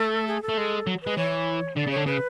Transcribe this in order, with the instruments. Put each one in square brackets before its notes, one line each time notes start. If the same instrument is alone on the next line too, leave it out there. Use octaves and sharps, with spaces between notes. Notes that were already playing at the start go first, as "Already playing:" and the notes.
Already playing: [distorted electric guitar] A3 [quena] A4
[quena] G#4
A4
[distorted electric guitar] A3
G#3
F#3
[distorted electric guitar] G#3 [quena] B4
[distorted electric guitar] E3 [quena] C#5
[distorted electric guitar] D3 [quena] D5
[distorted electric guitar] C#3 [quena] C#5
[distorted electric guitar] D3
[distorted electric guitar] C#3 [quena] B4